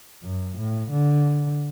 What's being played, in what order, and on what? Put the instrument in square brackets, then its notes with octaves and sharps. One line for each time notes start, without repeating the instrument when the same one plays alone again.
[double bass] F#2
A2
D3